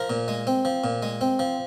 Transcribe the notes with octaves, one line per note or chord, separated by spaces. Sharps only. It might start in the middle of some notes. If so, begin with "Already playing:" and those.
Already playing: F3 A#4
A#2
G#3
C4
F3
A#2
G#3
C4
F3